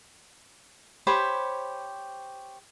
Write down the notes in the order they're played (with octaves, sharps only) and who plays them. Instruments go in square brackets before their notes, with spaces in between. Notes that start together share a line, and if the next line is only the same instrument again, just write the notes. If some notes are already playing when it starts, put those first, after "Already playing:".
[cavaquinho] G4 C5 C#5 B5